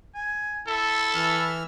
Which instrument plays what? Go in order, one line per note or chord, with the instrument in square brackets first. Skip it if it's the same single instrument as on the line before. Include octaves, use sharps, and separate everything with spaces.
[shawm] G#5
[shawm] E4 [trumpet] A4
[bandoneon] E3 E6 F6